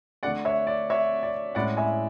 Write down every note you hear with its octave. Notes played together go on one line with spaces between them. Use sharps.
D3 A3 D4 D5 F#5
C#5 E5
D5
C#5 E5
D5
A2 G#3 C#4 E4 D5 F#5
E5 G#5